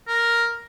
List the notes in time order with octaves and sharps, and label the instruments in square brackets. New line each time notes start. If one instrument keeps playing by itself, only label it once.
[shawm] A#4